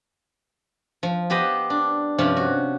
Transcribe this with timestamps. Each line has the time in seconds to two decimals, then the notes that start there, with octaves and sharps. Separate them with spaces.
1.03 F3
1.30 B3 G4 C5 D#5
1.70 D4
2.18 G2 C3 F3 C#4 F4
2.36 F#4